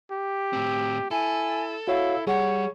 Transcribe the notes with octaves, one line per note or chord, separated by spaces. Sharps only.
G4
A2 C4
E4 A4 G#5
E4 F#4 C#5 F5
G3 G#4 C#5 F#5